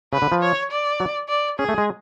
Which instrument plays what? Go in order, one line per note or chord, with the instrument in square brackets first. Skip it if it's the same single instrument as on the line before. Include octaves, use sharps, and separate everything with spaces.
[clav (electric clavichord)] C#3 [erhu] B4
[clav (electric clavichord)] D3
F3
[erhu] C#5
D5
[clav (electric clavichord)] F#3
[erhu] D5
[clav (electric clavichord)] C#4 [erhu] G#4
[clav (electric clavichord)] A3
G#3